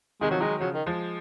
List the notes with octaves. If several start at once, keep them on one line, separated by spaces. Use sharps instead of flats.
C3 D#3 G#3
F3 F#3
D#3 F#3 G#3
C#3 F3 F#3
D#3
F3 G#3